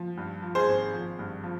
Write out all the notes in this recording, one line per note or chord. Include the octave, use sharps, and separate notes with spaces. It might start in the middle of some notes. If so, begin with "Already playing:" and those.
Already playing: F3
G2
F3
G#4 C5
G#1
F3
G2
F3